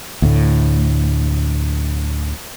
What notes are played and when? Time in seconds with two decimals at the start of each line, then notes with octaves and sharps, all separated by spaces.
0.22 D2 A2